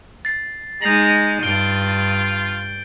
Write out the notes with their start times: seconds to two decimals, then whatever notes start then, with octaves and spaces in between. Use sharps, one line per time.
0.25 A6 C7
0.82 G#3 D#4 A#5 G6 C7 F#7
1.43 G2 F4 D7 G7